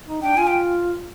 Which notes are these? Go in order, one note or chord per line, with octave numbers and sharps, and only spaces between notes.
D#4
D4 G5
F4 G#5
G5